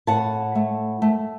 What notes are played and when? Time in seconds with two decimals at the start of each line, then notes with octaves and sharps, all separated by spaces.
0.07 A2 F#5 A5
0.55 A3
1.02 A3